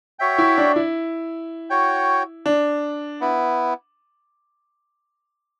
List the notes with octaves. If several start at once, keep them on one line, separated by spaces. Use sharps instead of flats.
F#4 C#5 E5 G5
E4
D4
E4
F#4 C#5 G5
D4
B3 E4